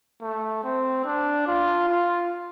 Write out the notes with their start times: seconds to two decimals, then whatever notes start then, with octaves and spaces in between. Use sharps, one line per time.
0.21 A3
0.63 C4
1.05 D4
1.47 F4
1.88 F4